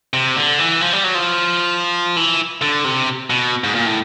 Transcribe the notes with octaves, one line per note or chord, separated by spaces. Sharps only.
C3
D3
E3
F3
G3
F#3
F3
E3
D3
C3
B2
G#2
A#2
A2